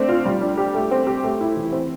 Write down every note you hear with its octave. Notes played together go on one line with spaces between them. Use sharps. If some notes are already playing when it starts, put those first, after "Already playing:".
Already playing: A3 C4 D4
F4
G3
D4
G4
A3
C4
G4
A3
E4
E3
C4